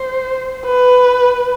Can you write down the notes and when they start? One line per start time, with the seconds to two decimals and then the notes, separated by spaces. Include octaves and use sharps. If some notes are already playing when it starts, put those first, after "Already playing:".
Already playing: C5
0.65 B4